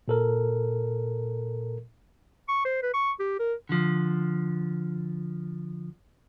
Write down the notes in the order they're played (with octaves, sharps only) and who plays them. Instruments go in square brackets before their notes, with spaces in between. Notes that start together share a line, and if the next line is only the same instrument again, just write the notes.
[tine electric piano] A#2 A4 A#4
[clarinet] C#6
C5
B4
C#6
G4
A#4
[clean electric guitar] D3 F3